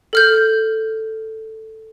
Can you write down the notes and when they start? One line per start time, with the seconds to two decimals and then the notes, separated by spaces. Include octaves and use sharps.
0.13 A4 F6 G6